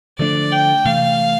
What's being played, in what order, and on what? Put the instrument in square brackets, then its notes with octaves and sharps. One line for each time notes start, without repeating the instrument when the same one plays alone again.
[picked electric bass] D3 F3 A3 D4 [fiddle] D5
[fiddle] G5
[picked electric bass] C3 E3 A3 [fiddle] F5